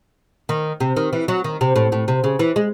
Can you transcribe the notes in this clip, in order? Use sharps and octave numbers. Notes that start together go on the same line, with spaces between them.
D#3
C3
D#3
E3
F#3
D#3
C3
A2
A2
C3
C#3
E3
G#3